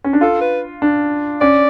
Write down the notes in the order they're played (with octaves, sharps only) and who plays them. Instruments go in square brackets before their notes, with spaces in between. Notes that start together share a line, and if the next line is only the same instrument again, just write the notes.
[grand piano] C#4
D4
[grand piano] F4 [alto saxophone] A4
[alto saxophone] B4
[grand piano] D4
[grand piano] C#4 [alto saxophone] D5